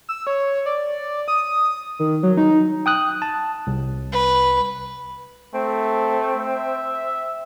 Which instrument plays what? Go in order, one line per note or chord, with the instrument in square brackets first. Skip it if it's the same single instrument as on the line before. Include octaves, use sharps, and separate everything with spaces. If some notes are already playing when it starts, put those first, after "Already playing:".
[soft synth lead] E6
C#5
D5
D#6
D#3
F#3
D#4
[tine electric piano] G5 D#6 F#6
A5
C2
[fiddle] B4
[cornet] A3 [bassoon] C4
[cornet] E5